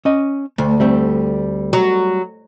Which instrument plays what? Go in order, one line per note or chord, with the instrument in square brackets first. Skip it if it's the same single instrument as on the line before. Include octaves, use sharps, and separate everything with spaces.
[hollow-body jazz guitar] C#4 D#5
[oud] D2 [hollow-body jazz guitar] A3
[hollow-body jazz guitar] G3 A3 C4
[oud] F#3